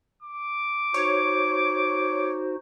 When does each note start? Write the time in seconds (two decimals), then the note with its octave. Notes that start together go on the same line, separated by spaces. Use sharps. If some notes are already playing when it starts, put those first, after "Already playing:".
0.22 D6
0.94 D#4 F#4 C5 C#5